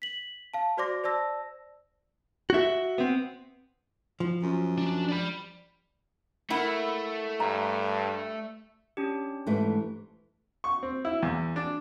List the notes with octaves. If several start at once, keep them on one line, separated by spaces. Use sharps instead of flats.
B6 F#7
F5 A5
F#4 C5 D5 C6 D6 A#6
C5 D5 A5 E6 A#6
F#4 E5
B3 C4
F3
F#2
D4
D5 B5
A3 E4 A#4 F#5
G2 A#5
C#4 D4 G4
G#2 E3 A3
C#6
C4
E4
E2
D4